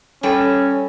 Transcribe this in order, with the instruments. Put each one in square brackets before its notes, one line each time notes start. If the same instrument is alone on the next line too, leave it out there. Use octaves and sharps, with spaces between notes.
[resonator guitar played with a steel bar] G3 A4 G5 [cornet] C#4